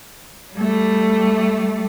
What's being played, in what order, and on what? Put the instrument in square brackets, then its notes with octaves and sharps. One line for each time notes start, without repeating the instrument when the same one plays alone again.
[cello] G3 A3